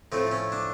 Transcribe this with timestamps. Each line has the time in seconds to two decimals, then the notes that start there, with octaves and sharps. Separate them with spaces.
0.12 A2 F3 A3 C4
0.32 C#4
0.52 D4